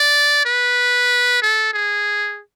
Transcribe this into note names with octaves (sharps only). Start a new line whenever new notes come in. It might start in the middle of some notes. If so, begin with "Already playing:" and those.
Already playing: D5
B4
A4
G#4